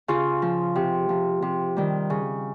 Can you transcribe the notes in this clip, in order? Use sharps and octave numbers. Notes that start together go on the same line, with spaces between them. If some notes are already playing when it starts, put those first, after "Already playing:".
C#3 F4
F3
C3
F3
C3
D#3 G3
C#3